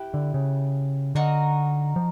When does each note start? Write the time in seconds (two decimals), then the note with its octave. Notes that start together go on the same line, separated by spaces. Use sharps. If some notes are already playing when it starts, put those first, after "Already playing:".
Already playing: E4 G4 B4
0.14 D3
0.34 C#3
1.15 D3 D#4 F#4 A#4
1.96 F3